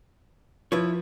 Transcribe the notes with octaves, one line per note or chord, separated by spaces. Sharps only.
F3 E4 B4 C#5